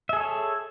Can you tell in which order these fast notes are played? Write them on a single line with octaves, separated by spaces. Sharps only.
E5 G#4 A4 C#5